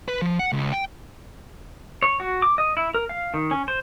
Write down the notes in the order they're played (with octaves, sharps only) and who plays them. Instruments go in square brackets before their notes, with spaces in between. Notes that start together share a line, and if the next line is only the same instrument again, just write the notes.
[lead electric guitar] B4
F3
F#5
C#2
G5
[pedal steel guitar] C#5
F#4
D6
D#5
E4
A#4
F5
D#3
C#4
C5